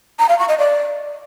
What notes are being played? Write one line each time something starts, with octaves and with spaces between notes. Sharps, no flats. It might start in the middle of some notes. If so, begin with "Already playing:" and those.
A#5
F5
C#6
D#5
D5